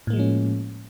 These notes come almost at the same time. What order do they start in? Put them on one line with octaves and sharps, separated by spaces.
A2 A#3 G#3 F3 C#4